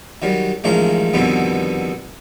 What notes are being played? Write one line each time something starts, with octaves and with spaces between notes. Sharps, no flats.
D#3 F#3 G3
A1 D#3 F3 G#3 C#4 A#5
F2 B2 D3 D#3 G3 B3